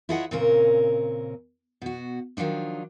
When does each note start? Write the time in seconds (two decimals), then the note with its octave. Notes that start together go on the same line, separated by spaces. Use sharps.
0.09 E4 F4 G#4 C#5 D#5 F#5
0.31 A#2 C#3 C4 C#4 A#4
1.82 B2 F#4
2.37 D#3 F3 F#3 D4 D#4